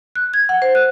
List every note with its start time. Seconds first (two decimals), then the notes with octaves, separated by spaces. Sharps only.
0.15 F#6
0.34 G#6
0.49 F#5
0.62 C5
0.75 F#6